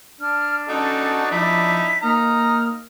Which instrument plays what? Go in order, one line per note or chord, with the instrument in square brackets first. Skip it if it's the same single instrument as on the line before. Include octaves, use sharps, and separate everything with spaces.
[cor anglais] D4 [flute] F6
[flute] C#4 [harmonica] D#4 F#4 A4
[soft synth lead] F3 [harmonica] D#4 E4 [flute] B6
[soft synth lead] A#3 [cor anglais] D#4 [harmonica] A#5 [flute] F6